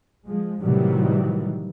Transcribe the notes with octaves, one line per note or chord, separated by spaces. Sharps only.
F3 G#3
A2 C3 D#3 E3 F#3 G3